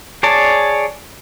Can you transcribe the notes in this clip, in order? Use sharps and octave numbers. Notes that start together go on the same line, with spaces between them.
G#4 C#5 D5 A5